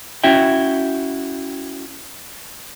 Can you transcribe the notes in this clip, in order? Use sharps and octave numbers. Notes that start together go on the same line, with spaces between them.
C#4 E4 F#4 E5 G5